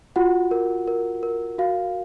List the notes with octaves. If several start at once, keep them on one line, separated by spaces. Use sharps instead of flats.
F4 F#4 F#5
A#4
A#4
A#4
F#4 F5